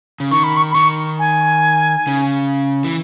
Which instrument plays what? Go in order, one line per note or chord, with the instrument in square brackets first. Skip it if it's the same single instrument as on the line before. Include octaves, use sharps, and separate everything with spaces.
[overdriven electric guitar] C#3
[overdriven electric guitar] D#3 [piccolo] C#6
[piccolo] B5
C#6
B5
[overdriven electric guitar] D#3 [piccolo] C#6
[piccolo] G#5
[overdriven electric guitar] C#3
E3